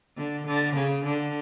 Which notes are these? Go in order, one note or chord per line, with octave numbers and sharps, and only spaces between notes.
D3
D3
C#3
D3